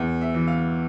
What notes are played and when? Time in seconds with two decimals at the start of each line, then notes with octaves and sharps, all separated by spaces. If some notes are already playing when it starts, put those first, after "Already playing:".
Already playing: E2
0.21 E5
0.34 E3
0.47 F5